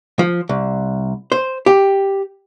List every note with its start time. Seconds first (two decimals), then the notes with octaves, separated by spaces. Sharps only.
0.19 F3
0.49 C2
1.32 C5
1.66 G4